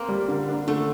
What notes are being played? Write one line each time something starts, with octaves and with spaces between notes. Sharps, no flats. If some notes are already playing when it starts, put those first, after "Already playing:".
Already playing: A#3 C4
G3
D3
D4
D3 A3